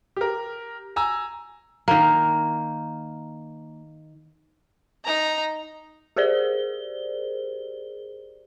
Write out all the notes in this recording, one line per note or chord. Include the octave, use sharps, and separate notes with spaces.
G4 A#4
G#5 A#5 E6
D#3 A#3
D#4 A#5
G4 G#4 A#4 C5 D5 G7